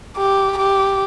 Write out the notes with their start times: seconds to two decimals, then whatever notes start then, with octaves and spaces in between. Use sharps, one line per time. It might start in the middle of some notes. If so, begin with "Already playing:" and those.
0.17 G4
0.58 G4